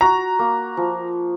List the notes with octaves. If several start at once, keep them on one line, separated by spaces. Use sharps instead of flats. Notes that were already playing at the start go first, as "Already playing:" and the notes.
F#4 A#5
A#3
F3